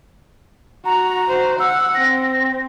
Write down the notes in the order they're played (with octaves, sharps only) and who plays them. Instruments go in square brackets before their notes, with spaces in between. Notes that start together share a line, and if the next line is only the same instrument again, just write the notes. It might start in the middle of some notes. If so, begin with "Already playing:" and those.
[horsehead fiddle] F#4 [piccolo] A#5
[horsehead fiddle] F#4 C5
[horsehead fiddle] F#5 [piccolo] E6
[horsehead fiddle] C4 [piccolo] A#6